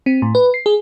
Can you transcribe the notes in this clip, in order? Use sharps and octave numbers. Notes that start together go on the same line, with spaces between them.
C4
A2
B4
C7
G#4